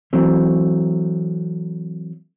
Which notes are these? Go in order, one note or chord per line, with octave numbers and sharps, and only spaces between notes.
E3 F#3 A3 C4